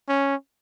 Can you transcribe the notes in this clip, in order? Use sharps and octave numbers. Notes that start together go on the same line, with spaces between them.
C#4